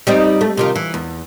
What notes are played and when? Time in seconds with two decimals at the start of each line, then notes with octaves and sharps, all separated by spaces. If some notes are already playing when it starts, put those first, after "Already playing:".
0.07 G3 C4 D#4
0.41 A3
0.57 C3 D#3 F4
0.76 E3
0.94 E2